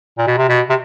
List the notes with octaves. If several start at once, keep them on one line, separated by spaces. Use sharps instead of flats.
A#2
B2
C3
B2
C3